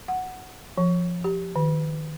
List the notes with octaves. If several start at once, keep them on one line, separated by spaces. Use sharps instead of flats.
F#5
F3
G4
D#3